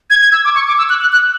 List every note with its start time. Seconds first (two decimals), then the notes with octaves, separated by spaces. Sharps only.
0.10 G#6
0.21 G#6
0.32 E6
0.45 D6
0.55 C#6
0.68 D6
0.78 E6
0.90 F#6
1.01 F#6
1.12 F#6